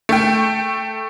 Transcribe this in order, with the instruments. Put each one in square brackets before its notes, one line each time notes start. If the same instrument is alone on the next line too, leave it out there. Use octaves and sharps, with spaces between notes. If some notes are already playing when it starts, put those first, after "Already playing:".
[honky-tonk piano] A3 G5